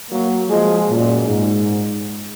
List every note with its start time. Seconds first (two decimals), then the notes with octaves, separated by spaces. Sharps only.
0.10 F#3 A#3
0.49 F3 G#3
0.88 F#2 A#2
1.27 G#2